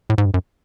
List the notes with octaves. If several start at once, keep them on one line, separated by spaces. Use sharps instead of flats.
A2
G#2
G2
F#2